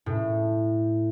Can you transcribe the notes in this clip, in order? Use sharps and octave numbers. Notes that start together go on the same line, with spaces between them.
A2